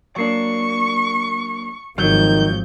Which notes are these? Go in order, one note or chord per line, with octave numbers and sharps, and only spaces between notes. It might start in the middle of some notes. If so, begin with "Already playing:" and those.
F#3 A#3 D4 C#6
G#1 D#3 F3 F#3 G6